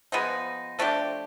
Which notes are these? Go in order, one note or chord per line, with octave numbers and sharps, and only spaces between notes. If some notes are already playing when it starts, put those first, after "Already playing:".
F3 G#3 B3 D#4
F3 A3 D4 G4